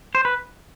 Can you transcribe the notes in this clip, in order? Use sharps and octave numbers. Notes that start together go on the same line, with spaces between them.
C5
B4